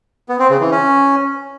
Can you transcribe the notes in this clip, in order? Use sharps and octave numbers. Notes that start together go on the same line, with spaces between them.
B3
C4
C#3
E3
C#4